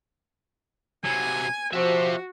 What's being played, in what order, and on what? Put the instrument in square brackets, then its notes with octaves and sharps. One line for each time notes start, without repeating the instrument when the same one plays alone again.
[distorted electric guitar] C3 F#3 [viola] G#5
[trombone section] F3 [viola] F#4 [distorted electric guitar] G4 E5